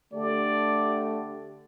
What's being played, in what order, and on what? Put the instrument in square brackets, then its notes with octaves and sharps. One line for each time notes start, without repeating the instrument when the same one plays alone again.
[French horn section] D3 G4 [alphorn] A3 [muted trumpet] D5